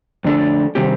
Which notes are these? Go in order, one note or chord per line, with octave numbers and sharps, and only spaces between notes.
F2 D3 A3 D4 A4
C3 D#3 G3 C4 G4